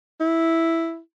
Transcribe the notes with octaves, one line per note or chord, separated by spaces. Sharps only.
E4